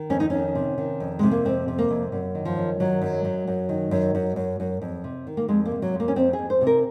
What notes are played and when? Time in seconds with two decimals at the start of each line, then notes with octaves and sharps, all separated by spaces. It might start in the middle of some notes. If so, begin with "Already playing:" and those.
Already playing: D#3
0.10 F2 C#4
0.20 D#4
0.30 D#3 C#4
0.55 C3
0.78 D#3
1.00 F2
1.19 C3 G#3
1.31 A#3
1.45 F2 C4
1.68 C3
1.78 A#3
1.90 F2
2.12 F#2
2.35 D#3
2.45 F3
2.57 F#2
2.80 D#3 F#3
3.02 F#2
3.25 F#2
3.47 F#2
3.69 D#3
3.91 F#2
4.15 F#2
4.36 F#2
4.60 F#2
4.82 F2
5.04 C3
5.27 D#3
5.37 A#3
5.49 F2 G#3
5.65 A#3
5.71 C3
5.82 F#3
5.94 F2
6.00 A#3
6.08 C#4
6.16 F2 C4
6.33 G#4
6.39 F2
6.50 C5
6.61 C3
6.67 A#4